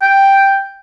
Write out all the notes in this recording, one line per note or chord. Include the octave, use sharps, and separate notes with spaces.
G5